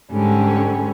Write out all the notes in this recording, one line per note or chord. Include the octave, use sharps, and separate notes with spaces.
G#2 D3 G3 C#4